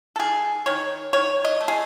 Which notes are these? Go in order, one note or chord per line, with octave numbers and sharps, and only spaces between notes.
A4
D#3 G#4
D#3 C#5
D#3 C#5
D#5
A3
G#4